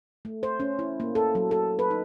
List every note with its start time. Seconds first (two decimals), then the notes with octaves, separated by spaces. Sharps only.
0.25 A3
0.43 C5
0.60 C#4
0.79 E4
1.00 A#3
1.15 A4
1.35 F#3
1.51 A4
1.79 B4
1.91 D#4